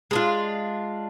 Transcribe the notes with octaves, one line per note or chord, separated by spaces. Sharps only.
G#3 D4 F4